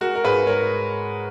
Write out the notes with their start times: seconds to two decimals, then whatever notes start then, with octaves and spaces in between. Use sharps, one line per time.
0.01 G#3 F#4 A#4
0.15 A#4
0.24 G#2 G#4 B4
0.47 G#3 A#4 C#5